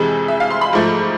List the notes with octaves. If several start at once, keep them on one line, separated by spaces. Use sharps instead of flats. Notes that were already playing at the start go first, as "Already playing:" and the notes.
Already playing: F2 C3 E3 G#3
E5
F5
C6
B5
G#2 F3 A3